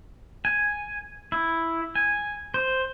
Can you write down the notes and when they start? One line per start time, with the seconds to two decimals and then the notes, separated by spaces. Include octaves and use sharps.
0.45 G#5
1.32 E4
1.95 G#5
2.54 C5